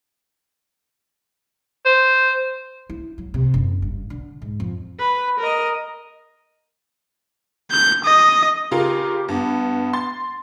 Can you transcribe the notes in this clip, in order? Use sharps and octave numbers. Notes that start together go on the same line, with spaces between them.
C5
E4
F#3
C3
F#1
G2
D3
G#2
F2
B4
A#4 D#5
G6
D#5
C#3 F4 G4 A#4
G2 B3
C6 A6